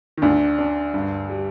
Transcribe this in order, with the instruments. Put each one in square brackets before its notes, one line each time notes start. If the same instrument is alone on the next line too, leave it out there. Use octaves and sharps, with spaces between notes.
[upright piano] D#3
[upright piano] D2 D3 [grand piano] D4
[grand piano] D4
G2
G3